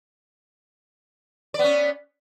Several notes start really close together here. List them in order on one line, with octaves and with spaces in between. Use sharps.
D5 B3 C#4